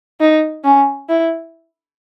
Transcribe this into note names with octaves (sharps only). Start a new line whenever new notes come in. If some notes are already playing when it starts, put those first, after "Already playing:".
D#4
C#4
E4